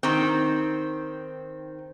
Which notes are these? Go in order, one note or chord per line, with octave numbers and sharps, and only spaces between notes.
D#3 C4